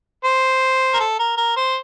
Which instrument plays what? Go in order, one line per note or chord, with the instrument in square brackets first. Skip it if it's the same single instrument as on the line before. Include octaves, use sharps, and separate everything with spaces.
[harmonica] C5
A#4
A4
A#4
A#4
C5